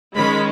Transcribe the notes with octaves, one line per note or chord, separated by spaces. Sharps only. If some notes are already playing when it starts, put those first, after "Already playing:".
D#3 G#3 C#4 B5